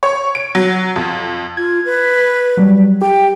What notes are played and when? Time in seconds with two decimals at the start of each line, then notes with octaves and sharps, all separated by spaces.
0.03 C#5
0.35 D7
0.55 F#3
0.96 F2
1.57 F4 G#6
1.85 B4
2.57 F#3 G3
3.01 G4 G5